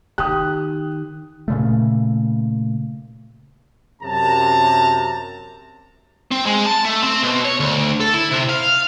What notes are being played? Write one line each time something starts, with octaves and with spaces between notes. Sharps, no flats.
D#3 G4 D#6 F#6
A#2 C#3 A3
F#2 C3 A5 A#5
C4
G#3
A5
A3
C4
B2
C#5
D2
A4
E4
C3
F5